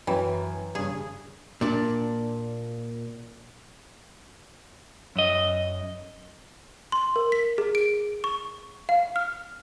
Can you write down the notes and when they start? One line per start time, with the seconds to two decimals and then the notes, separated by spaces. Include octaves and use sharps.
0.07 F#2 E3 G5 G#5
0.75 G2 C#3 G#4
1.61 A#2 D4
5.16 F#2 D#5
6.92 C6
7.16 A#4
7.32 B6
7.58 G#4
7.75 D7
8.24 C#6
8.89 F5
9.16 F6